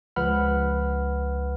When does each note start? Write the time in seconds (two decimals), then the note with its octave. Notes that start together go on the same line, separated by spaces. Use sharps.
0.16 C#2 F3 B4 F#5 B5 F6